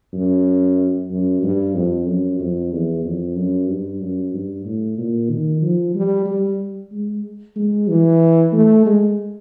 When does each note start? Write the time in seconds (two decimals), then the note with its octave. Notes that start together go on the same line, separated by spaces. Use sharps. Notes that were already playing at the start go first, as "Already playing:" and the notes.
0.13 F#2
1.11 F#2
1.43 G2
1.74 F2
2.06 F#2
2.39 F2
2.72 E2
3.04 F2
3.36 F#2
3.68 G2
4.00 F#2
4.33 G2
4.65 A2
4.98 A#2
5.30 D#3
5.62 F3
5.95 G3
6.26 G3
6.92 G#3
7.56 G#3
7.88 E3
8.53 A3
8.86 G#3